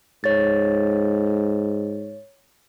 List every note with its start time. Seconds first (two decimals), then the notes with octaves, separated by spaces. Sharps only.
0.24 G#2 C#5 A6